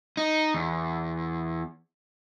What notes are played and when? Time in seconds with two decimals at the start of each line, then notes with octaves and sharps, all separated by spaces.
0.17 D#4
0.54 E2